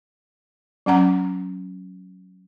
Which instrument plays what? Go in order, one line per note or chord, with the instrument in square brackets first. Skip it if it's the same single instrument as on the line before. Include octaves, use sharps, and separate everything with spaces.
[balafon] F#3 C#4 F#5 A#5